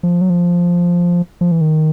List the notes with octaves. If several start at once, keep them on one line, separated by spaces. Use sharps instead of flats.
F3
F#3
F3
F3
E3
D#3